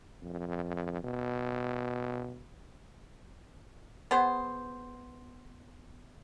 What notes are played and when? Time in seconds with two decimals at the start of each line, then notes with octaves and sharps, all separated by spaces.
0.22 F2
1.04 B2
4.11 B3 G#4 C5